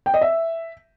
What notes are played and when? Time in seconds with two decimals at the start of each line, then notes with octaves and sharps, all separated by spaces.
0.06 G5
0.14 D#5
0.21 E5